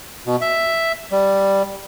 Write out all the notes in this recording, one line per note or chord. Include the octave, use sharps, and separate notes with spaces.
B2
E5
G3